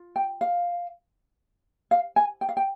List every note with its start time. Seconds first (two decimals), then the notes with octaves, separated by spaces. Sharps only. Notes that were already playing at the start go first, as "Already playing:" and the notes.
Already playing: F4
0.16 G5
0.41 F5
1.91 F5
2.16 G#5
2.41 G5
2.49 F5
2.57 G5